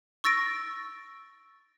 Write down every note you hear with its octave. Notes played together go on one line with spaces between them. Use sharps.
C#6 E6 A6 A#6 D7